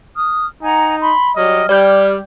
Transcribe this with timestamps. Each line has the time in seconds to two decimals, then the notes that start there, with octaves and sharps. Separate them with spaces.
0.16 D#6 F6
0.62 D#4 F#5 G#5 A#5
1.00 B5 C6
1.36 F#3 G3 D#5 F6
1.69 G3 G4 D5 G6